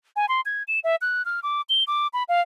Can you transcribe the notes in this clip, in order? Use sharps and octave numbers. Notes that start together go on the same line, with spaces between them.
G#5
C6
G#6
E7
E5
F#6
F6
D6
G7
D6
B5
F5